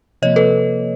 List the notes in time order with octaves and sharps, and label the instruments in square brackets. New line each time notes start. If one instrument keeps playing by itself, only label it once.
[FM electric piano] C3 F3 A#3 [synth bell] C#5 D#5
[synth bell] A4 B4